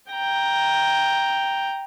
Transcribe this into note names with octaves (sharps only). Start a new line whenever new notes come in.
G5 A#5